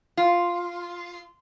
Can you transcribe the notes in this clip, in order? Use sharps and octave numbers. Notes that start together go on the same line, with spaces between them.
F4